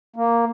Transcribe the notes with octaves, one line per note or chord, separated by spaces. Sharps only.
A#3